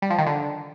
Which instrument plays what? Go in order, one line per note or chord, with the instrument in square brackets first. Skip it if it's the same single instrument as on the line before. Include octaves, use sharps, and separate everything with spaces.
[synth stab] G3
F3
D#3
D3